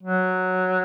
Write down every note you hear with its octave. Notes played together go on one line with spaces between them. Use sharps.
F#3